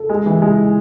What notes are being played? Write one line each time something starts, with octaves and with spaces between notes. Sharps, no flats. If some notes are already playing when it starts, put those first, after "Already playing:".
Already playing: A4
G#3
E3
G#3